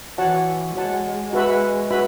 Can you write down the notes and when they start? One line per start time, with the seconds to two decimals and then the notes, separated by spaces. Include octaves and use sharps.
0.18 E3 F#4 C#5 F#5 A5
0.76 G#3 F#4 C#5 F#5 A5
1.33 F#4 B4 E5 B5
1.91 F#4 B4 E5 B5